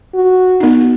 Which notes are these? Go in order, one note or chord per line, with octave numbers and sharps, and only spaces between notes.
F#4
B3 D#4